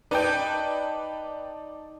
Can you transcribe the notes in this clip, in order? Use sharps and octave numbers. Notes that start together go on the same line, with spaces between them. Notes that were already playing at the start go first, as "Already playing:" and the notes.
D#4 B4 D5 G5 A5 G6